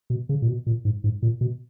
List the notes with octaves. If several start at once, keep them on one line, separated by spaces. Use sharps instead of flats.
B2
C#3
A#2
B2
A#2
G#2
G#2
A#2
B2